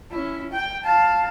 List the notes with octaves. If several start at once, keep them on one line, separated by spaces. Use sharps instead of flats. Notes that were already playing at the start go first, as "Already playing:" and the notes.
C#4 E4
G5
F5 A5